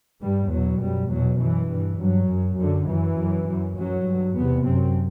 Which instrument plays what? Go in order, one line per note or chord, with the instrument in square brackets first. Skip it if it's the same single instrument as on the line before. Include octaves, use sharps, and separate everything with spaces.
[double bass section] G2 G3
E2 B2 F#3
F#2 G3
E2 B2 F#3
F#2 E3
G2
G2 F#3
F#2
F#2 D3
F#2 E3
F#2
F#2
F#2 F#3
G2
E2 C3 B3
F#2 C4